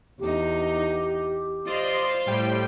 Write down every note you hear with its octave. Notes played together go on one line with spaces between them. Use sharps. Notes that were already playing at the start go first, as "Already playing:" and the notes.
E2 D#4 G4
F4 C5 D5 D#5 C6
A2 G3 G5